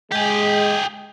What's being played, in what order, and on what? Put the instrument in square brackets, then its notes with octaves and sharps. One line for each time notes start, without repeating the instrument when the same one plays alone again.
[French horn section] G#3 [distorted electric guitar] G4 G#4